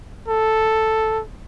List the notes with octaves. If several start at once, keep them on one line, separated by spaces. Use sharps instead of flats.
A4